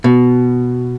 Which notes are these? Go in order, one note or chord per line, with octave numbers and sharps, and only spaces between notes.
B2